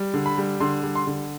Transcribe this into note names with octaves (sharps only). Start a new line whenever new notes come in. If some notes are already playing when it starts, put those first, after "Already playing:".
Already playing: G3
D3
B5
G3
D3 C6
G3
C6
D3